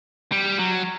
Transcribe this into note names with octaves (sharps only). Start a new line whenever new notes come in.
G3
F#3